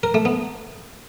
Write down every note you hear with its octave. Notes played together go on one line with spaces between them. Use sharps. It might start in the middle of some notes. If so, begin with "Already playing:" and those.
A#4
A3
B3